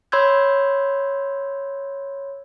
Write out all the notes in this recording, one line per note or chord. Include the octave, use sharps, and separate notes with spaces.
C#5 B5 C6 E6 G6 G#6